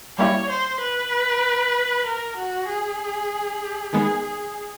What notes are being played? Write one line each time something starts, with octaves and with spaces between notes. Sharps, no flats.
G3 A#3 C#4 E4 G4 C#5
C5
B4
A#4
F#4
G#4
D#3 G#3 B3 G#4
G#4